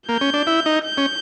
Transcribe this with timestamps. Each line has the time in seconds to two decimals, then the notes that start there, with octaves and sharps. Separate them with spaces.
0.09 A#3 G6
0.21 C#4
0.34 D4
0.47 E4
0.66 D#4
0.84 G6
0.98 C#4